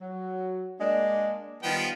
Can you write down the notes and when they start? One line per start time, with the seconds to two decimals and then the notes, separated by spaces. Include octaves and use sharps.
0.01 F#3
0.79 G#3 A#3 D4
1.63 D#3 F3 G3 B3 G5